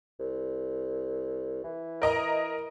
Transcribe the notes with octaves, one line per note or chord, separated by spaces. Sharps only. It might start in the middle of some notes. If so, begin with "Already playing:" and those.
C2
E3
A#4 D#5 A#5